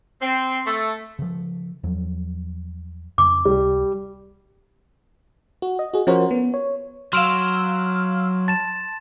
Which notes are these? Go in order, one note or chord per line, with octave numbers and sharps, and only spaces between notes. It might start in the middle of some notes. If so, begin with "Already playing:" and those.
C4
A3
C#3 F3
E2 F3 F#3
F2 C#3 C#4 D6
C#2 C3 G3
F#4
D#5
F#4 G#4
F3 C#4 F#4 A#4 C5 C#5
B3
C#5
F#3 F5 C6 E6 F6 D7 E7
A5 A6 E7